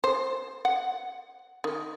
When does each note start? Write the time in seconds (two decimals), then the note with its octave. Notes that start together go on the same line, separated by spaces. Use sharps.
0.04 C5
0.65 F#5
1.64 D#3